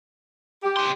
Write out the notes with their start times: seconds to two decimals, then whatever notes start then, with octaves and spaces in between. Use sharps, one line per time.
0.63 G4
0.77 G3 C6